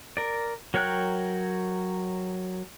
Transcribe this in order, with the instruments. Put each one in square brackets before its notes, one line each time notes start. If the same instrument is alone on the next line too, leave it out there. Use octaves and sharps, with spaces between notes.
[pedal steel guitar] A#4 D5
F#3 A#4 C#5 G5 F#6